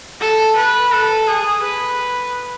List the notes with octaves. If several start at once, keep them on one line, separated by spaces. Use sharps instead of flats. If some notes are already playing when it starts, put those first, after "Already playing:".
A4
B4
A4
G#4
B4